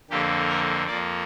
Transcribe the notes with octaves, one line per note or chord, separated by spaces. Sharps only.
F2 D3 A#3 G4
A#4
F2 F3 A#3 D5